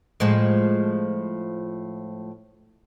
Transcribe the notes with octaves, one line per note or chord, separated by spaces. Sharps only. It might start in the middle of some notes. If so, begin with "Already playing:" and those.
A2 F3 G#3